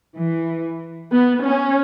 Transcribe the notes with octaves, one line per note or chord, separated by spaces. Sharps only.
E3
B3
C#4